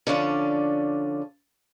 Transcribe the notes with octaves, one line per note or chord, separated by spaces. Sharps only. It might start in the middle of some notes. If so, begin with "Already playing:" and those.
D3 F3 C#4 D5